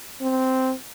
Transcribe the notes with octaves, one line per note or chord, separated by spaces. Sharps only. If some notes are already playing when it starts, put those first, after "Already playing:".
C4